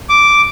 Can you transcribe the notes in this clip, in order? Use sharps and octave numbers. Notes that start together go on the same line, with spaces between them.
D6